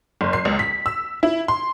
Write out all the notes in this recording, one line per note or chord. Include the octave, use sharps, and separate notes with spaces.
F#1
C7
C#2
B6
E6
E4
C6